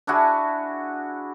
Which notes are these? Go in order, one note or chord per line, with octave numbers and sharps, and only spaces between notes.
D4 E4 F#4 G#4